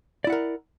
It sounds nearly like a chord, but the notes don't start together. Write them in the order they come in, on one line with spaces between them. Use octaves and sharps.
D5 E4 F#5 A#4